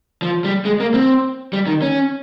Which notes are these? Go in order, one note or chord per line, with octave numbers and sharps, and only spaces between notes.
F3
G3
G#3
A#3
C4
G3
D#3
C#4